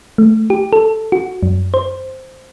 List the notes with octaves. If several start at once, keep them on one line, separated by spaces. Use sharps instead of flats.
A3
G4
A4
F#4
F#2
C5